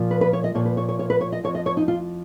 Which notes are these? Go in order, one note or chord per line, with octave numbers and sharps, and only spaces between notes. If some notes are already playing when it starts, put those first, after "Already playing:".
Already playing: A#2 F3
B4
B4
C#5
D#5
A#2 F3 C#5
B4
C#5
C#5
C#5
B4
C#5
D#5
F2 F3 C#5
D#5
C#5
D#4
F4